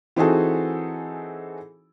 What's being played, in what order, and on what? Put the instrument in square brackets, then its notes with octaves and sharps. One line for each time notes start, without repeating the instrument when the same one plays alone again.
[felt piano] E3 C4 D#4 F#4 G#4 A4